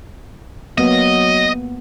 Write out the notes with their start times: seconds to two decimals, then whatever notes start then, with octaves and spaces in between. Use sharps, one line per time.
0.78 F#3 A#3 B3 D#5